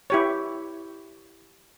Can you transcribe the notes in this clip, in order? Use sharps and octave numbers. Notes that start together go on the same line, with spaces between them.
E4 G4 C#5